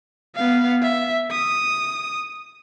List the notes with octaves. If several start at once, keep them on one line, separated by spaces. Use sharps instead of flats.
B3 F5
E5
D#6